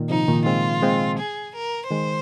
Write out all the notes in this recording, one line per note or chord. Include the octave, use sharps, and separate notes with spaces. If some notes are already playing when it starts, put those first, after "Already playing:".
Already playing: A#2 D#3
C3 F3 D#4
A#2 D#3
G#3 C4 F4
G#3 C4
G#4
A#4
D#3 G#3 C5